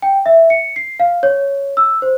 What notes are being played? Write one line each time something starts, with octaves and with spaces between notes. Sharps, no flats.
G5
E5
C#7
C7
F5
C#5
E6
C5